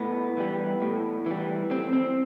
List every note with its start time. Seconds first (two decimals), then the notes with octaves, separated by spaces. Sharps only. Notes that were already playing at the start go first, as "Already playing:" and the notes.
Already playing: A2 B3
0.37 E3 G3
0.82 A2
1.26 E3 G3
1.70 A2 C4
1.93 C4